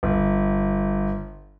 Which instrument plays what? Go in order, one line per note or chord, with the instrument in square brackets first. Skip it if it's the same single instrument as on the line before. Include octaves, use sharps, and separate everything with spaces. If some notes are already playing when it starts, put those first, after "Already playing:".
[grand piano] G1